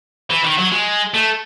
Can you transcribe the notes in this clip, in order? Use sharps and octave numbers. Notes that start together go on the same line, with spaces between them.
E3
D#3
F#3
G#3
A3